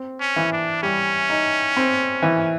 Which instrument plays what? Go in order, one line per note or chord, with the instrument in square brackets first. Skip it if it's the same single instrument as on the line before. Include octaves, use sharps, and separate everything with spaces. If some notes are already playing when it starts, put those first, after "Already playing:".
Already playing: [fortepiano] C4
[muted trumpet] C#4
[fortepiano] E3
[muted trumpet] D4
[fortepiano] G3 [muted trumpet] C#4
[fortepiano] D#4
C4
E3